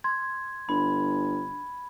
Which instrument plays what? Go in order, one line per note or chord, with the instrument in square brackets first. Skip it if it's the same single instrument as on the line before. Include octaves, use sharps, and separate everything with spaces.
[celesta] C6 [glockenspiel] G#6
[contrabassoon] G1 [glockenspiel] B5